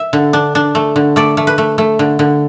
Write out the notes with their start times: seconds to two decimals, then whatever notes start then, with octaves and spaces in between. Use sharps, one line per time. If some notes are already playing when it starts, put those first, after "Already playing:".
Already playing: E5
0.13 D3
0.33 D4
0.55 D4
0.75 A3
0.96 D3
1.16 A3 D5
1.37 A3
1.47 B4
1.58 A3
1.78 A3
1.99 D3
2.19 D3